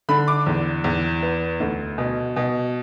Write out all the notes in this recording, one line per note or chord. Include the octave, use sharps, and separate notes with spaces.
D3 B5
D6
E2
E2
B3
D2
B2
B2